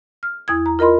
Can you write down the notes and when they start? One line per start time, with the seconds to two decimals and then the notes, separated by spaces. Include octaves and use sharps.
0.23 F6
0.48 E2 E4 D#6 G#6
0.66 A#5
0.79 F4 A#4 D#5 B5 C6